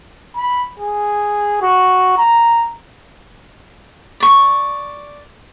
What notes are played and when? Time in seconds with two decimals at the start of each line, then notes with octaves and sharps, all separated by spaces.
0.36 B5
0.79 G#4
1.62 F#4
2.18 A#5
4.20 D5 C#6